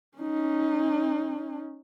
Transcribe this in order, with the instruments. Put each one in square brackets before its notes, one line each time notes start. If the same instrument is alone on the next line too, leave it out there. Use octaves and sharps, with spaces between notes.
[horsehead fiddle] C#4 D#4